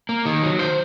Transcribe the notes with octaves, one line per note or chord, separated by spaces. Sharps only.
A#3
D#3
F#3
C5